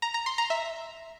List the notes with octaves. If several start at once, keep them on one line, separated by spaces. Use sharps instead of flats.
A#5
A#5
C6
A#5
E5